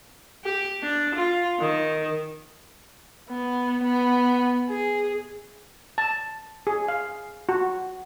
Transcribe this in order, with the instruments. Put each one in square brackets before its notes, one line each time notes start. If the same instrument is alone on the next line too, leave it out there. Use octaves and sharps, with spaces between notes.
[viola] G4
D4
F4
D#3
[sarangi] B3
B3
G#4
[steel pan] A5
G#4
F5
F#4